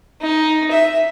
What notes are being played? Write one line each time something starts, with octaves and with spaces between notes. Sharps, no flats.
D#4
E5